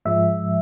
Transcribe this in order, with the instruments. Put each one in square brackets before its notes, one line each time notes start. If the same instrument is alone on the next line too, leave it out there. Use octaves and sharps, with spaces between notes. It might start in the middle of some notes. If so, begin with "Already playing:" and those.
[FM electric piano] G#2 F3 G#3 E5